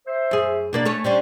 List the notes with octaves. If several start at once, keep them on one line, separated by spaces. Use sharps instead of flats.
C5 E5
F#2 G#4
B2 A#3 D4 D5
A3 C#4 C#5
G3 C#4 D4 C5